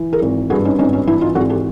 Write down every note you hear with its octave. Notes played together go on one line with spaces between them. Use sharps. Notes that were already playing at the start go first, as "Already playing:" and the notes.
Already playing: E3
G#4 A#4
G#1
G2 F#4 G#4
C#4 D#4
G#1 C#4 D#4
C#4 D#4
E3 D4 E4
D#4 F4
G#1 F#4 G#4
G4 A4